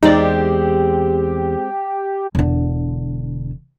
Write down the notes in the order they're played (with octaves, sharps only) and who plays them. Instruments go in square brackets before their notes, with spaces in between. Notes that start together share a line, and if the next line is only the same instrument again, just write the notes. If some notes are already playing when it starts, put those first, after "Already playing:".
[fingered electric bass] E2 [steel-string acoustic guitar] G#3 C4 [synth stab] D#4 D5 [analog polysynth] G4
[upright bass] E1 D3